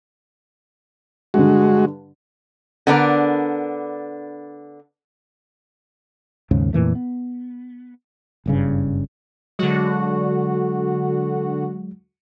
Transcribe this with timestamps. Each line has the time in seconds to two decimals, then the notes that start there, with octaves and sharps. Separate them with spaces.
1.34 G2 D3 G#3 F#4
2.87 D3 B3 D4 A#4
6.51 D#2 G#2 C#3
6.73 F2 A#2 E3 A3
6.95 B3
8.46 F#1 G2 C#3
9.59 D3 F#3 G#3 F#4